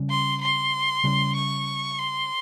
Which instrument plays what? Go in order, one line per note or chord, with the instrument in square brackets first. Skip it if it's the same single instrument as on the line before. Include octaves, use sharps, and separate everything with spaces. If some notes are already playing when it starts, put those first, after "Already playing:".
Already playing: [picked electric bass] C#3 G3 C#4
[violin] C6
C6
[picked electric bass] C#3 G3 C#4
[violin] C#6
C6